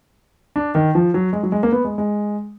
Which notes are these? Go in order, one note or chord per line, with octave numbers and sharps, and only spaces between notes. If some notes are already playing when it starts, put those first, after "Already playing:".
D4
D#3
F3
F#3
G#3
F#3
G#3
A#3
B3
G#3
G#3